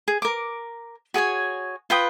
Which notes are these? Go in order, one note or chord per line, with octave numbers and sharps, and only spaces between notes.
G#4
A#4 D6
F#4 G#4 C#5 G#5
F4 B4 G5 D#6